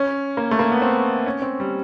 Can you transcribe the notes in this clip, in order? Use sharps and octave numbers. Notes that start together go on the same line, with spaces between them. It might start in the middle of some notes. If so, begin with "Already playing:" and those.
Already playing: C#4
A#3
A3
A#3
B3
C4
C#4
C4
G3